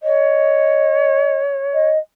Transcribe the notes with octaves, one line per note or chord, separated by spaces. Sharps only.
C#5 D#5
D#5